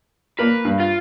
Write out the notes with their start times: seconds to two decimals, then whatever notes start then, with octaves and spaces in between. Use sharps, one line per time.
0.39 A#3 A#4 B4
0.65 G2
0.80 F4